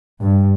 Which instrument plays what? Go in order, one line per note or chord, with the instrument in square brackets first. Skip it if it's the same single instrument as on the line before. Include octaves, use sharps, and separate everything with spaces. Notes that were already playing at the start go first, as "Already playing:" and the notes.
[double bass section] G2